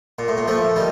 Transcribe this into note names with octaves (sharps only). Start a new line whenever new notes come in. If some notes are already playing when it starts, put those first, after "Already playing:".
A#2
A2
A#2
F3 A3
D#3 G3